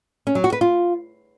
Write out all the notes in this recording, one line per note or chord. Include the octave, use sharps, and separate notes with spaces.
C#4
F#3
F#4
B4
F4